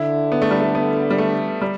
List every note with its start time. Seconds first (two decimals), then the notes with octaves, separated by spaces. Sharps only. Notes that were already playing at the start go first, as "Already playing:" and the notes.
Already playing: D3 E4
0.32 B3
0.42 A3
0.51 G3
0.60 A3
0.75 B3
1.10 G3
1.18 A3
1.62 G3